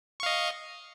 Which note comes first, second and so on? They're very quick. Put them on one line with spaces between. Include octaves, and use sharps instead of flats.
C#6 F5 D#5